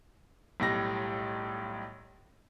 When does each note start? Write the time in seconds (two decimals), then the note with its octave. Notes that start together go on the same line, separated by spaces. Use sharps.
0.60 B1 A2 G3 A#6